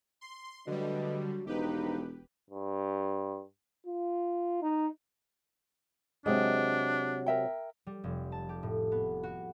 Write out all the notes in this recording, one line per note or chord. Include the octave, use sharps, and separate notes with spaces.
C6
D3 F#3 G3 A3 B4 D#5
E1 D2 F3 D#4 G4 B4
G2
F4
D#4
C3 F#3 G#3 D4 D#5
A#4 E5 G5
G3
F1
A5
G4
A2
B3
F#4